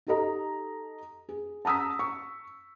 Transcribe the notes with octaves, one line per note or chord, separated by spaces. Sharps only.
D#4 G4 A4 D#5 A#5
G#4
A5 A#5 D#6 E6 B6
C#6